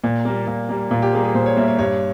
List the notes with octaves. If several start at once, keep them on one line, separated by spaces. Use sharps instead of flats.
A#2
G3 A#3
A#2
G3 A#3
A#2 F4
G4
G3 A#3 G#4
G#4
A#2 C5
C#5
G3 A#3 E5
C#5
G2 C#5